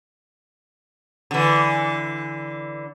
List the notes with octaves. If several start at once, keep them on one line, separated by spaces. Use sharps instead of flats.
D3 E3